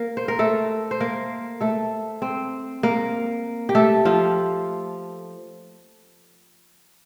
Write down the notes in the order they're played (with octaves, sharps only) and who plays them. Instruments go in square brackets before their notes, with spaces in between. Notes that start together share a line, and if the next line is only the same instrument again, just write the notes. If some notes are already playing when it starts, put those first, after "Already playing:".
Already playing: [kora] A#3 A#4
C5
A#4
A3 A4
C5
A#3 A#4
A3 A4
C4 C5
A#3 A#4
G4
A3 A4
F3 F4